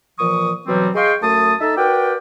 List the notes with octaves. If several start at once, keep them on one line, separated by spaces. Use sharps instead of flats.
A#2 E3 F3 C#6 D#6
B2 E3 F#3 G3 C4
G#4 D#5 F5 G5 C6 C#6
F#2 A3 A4 A5 D#6
D#4 A4 E5
F#4 A#4 B4 D5 G5